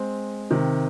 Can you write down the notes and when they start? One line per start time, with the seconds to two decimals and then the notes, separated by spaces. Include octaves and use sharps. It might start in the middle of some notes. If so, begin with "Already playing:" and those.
Already playing: G#3 C4
0.51 C3 D#3